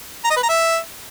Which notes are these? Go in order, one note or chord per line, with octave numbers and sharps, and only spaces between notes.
A#5
D#5
B4
A#5
E5